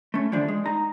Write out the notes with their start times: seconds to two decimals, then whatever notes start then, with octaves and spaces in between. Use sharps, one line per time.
0.14 A3 C#4
0.32 D3 E3 F3 D4
0.48 G#3
0.66 D#4 A#5